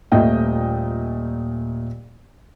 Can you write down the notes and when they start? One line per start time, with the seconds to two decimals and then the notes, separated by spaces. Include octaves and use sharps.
0.12 D#1 A#2 A3 D#5 G5